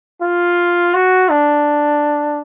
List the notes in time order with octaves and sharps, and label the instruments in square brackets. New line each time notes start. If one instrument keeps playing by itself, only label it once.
[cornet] F4
F#4
D4